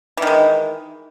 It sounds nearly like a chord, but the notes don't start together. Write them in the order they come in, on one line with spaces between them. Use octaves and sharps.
E3 D#3 G#3